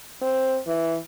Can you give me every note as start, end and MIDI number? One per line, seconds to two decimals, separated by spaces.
0.22 0.58 60
0.67 0.97 52